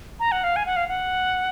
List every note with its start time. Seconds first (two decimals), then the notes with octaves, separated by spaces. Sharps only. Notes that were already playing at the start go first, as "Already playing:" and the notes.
0.20 A#5
0.32 F#5
0.44 F5
0.56 G#5
0.66 F#5
0.76 F5
0.88 F#5